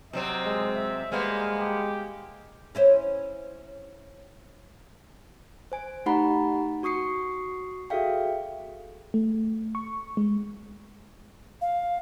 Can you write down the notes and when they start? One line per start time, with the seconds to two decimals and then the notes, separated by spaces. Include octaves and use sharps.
0.13 C3 F#3 C4 D#5
0.45 G#3
0.75 E5
1.12 G3 G#3 A#3 B3 C5
1.59 G4
2.75 C#4 E4 C5
5.72 C5 G#5 D7
6.06 A3 D#4 G4 F#5 A#5 B5
6.83 F#4 C#6 D#6 C7 C#7
7.90 F#4 G#4 A4 E5 F5 G5
9.14 A3
9.75 C#6
10.17 G#3
11.62 F5